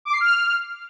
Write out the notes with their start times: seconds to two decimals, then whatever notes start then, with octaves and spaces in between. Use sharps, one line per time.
0.05 D6
0.13 C7
0.20 F6